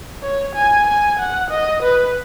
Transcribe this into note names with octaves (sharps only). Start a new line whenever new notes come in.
C#5
G#5
G#5
F#5
D#5
B4